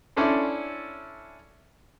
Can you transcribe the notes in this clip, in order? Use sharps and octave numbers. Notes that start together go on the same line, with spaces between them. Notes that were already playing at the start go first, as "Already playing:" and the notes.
C#4 D4 E4 A4 C5